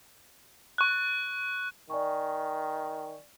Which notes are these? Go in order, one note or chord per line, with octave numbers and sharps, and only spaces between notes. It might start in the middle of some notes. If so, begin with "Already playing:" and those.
C#6 F#6
D#3 D5 G#5 C#6